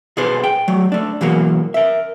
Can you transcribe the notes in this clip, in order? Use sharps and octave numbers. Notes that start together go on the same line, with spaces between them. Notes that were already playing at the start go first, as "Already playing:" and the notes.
B2 G#4 A4 B4 C5
G5
F#3 A3
A3 D4
B2 E3 F#3 A#3
A#4 E5